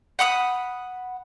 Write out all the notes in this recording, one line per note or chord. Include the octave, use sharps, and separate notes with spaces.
F#5 B5 D6 D#6